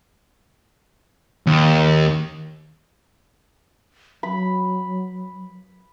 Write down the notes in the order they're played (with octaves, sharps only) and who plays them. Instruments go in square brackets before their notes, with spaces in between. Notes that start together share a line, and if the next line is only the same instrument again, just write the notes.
[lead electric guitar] D#2
[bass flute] F#3 [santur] B5